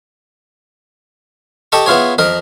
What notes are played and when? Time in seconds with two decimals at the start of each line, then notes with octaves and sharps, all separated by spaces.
1.72 G4 A4 D#5 A5 C#6
1.86 B3 E4 F4 G#4 C#5
2.18 F2 A#4 D#5